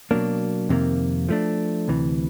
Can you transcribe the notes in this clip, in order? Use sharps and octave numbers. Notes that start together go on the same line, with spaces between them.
B2 F#3 A#3 D4
F2 C3 D#3 G3 A#3
F3 A3 D4
D2 C3 E3